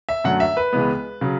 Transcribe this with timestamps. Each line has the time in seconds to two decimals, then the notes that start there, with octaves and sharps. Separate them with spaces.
0.09 E5
0.24 F#2 D3 F#3 A3 F#5
0.40 E5
0.57 B4
0.73 C#2 C#3 E3 G#3 B3
1.21 C#3 F#3